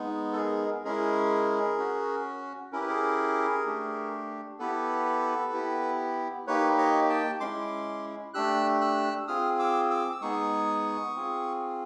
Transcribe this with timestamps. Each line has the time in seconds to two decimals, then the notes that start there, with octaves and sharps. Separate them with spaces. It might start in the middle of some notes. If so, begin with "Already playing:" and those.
Already playing: G#3 B3 D#4
0.33 A4
0.37 G#4 A#4
0.84 G#3 C#4 E4 G#4 A#4
1.78 C#4 F#4
2.72 C#4 E4 G4 A#4
2.81 B4
2.89 G#4 A#4
3.66 A3 D4 G4
4.59 B3 E4 G4 A4 B4
5.52 B3 E4 G4
6.47 A#3 D#4 G4 B4 C#5
6.78 C#5 D#5
7.09 G5 A5
7.40 G#3 C#4 E4 C6 D6
8.34 A3 D4 G4 E6 F#6
8.81 E6 F#6
9.28 C4 F4 G#4 D#6 F6
9.59 D6 E6
9.90 D6 E6
10.13 E6
10.21 G#3 B3 D#4 G#4 C#6 D#6
11.15 C4 F4 G#4